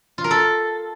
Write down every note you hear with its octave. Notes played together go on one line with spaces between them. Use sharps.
F4
A#4
A4